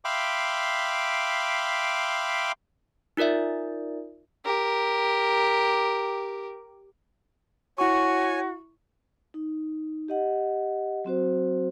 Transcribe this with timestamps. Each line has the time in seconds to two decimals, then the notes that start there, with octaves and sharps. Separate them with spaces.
0.05 E5 F5 G5 B5 C6 D6
3.17 D#4 F4 A#4 D5 E5
4.45 G4 A#4
7.78 E4 F#4 C#5 G#5 C#6
9.34 D#4
10.08 G4 D#5 F#5
11.04 F#3 C4 F#4 C5